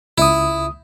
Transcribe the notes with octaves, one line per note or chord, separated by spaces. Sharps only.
C#2 E4 D#6